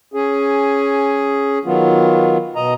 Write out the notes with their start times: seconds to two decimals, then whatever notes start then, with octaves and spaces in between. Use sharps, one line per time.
0.14 C#4 G#4
1.65 D#3 F#3 B3 F4
2.55 B2 D#5 A#5